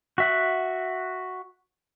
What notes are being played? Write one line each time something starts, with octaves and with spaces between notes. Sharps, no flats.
F#4 E5 F#5